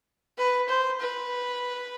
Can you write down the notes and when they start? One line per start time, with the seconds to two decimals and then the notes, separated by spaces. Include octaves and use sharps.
0.38 B4
0.69 C5
1.00 B4